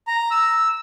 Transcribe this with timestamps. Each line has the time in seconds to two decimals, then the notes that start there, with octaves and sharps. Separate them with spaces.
0.07 A#5
0.31 E6